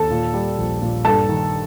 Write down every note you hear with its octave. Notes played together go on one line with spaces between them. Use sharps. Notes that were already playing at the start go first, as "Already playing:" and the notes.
Already playing: D#2 A4 A5
A#2
G3
A#1
A#2
G2 A4 A5
D#3